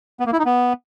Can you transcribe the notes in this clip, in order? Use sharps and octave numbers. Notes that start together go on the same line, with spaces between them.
B3
A#3
E4
D#4
B3